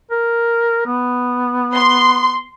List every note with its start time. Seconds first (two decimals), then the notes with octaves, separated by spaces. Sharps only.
0.11 A#4
0.86 B3
1.75 C6